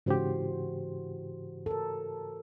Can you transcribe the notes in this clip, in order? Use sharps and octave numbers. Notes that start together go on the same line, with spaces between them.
G#2 C#3 E3 F#4 G4 C5
A4 A#4